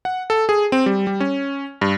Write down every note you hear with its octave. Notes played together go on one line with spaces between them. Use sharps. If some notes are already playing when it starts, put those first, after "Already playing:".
F#5
A4
G#4
C4
G3
G3
C#4
G2